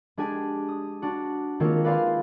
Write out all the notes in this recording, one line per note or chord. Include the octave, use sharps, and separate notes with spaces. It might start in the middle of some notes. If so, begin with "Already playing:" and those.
G#3 D4 G4 G#4 G#5
D#6
D4 F#4
D#3 G#3 A#3 C4 F4 C#5
B4 D5 F5 G#5 C6